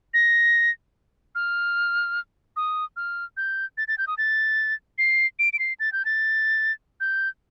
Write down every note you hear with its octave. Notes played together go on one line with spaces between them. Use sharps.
A#6
F6
D#6
F6
G6
A6
A6
G6
D#6
A6
C7
D7
D7
C7
A6
G6
A6
G6